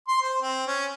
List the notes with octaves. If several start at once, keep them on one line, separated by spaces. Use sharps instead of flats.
C6
C5
C4
C#4